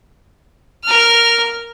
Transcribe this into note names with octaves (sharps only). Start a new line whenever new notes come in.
A#4 F6